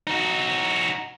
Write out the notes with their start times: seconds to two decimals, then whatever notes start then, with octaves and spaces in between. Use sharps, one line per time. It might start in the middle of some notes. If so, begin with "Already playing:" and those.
0.07 D#4 F#4